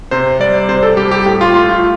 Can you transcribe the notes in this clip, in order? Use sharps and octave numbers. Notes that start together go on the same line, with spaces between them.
C3 C5
G3 D5
C3 C5
A4
G3 G4
G4
A2 G4
F4
A3 F4
F4